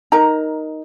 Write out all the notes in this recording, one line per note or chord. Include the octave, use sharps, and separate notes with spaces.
D#4 A#4 A#5